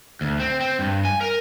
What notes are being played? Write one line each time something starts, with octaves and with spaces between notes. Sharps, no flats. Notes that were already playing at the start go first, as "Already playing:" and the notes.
D2
C4
C4
G2
G#5
A#4